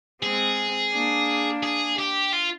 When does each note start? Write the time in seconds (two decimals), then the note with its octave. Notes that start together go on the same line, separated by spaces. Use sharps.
0.22 G#3 C4 G#4
0.92 A#3 D4
1.63 G#4
1.99 G4
2.33 F4